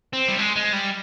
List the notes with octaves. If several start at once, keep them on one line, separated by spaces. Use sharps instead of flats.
C4
G3
G#3
G#3
G3